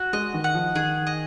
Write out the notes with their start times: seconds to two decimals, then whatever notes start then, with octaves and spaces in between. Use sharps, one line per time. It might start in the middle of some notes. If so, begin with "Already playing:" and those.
Already playing: F#4
0.13 G#3 D#5
0.34 D#3
0.44 F#5
0.55 F3
0.75 D#3 G#4
1.07 D#5